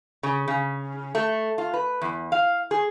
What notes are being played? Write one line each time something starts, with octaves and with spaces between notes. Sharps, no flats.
C#3
C#3
A3
F4
B4
E2
F5
G#4